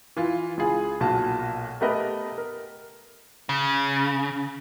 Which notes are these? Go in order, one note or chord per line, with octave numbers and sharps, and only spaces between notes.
E3 F4
C#2 F4 G#4 G#5
B1 A#2 F#4 A5
A3 B3 G4 A#4 B4 D#5
A#4
C#3